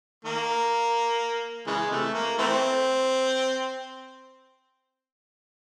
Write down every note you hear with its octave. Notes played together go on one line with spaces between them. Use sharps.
D#3 A#3
C#3 E3 G#3
C3 E3 A3
A#3
E3 A3 C4